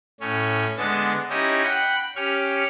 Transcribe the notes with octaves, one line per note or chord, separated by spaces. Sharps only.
A2 C#4
D3 G#3 B3 A5
C#4 D#4 E4 G4 D#5
F#5 G5 B5
C#4 G4 C#6 F6